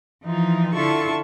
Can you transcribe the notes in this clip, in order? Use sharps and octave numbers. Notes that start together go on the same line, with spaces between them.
E3 F3 D#4 F4
D3 E4 F4 A4 A5 C#6